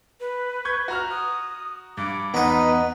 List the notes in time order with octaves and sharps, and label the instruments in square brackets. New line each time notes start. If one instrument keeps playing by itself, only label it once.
[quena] B4
[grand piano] C#6 G6 G#6
F#4 A#5 F6
[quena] D#6
[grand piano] G2 [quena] D6
[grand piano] E2 [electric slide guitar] B3 [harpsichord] D#4 B4 F#5 [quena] D#5